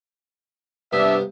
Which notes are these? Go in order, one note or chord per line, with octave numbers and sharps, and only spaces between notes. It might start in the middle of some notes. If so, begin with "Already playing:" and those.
G2 C3 B3 D4 E5